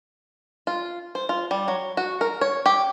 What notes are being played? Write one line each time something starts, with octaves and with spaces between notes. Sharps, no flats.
F4
C5
F4
G3
F#3
F#4
A#4
C#5
G4